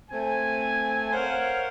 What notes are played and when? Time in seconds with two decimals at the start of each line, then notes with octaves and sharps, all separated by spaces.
0.11 A3 C4 G#5
1.12 A#4 C5 C#5 F5 F#5